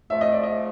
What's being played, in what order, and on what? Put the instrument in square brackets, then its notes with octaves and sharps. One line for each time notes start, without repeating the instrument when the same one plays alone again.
[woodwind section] G#2 F3 A3 [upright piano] E5
[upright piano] D#5
D5
D#5